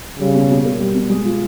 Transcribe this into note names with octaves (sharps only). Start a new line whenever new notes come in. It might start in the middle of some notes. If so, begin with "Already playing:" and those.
C#3 G3
B2
B2
A#3
G3
B2
G#3
F4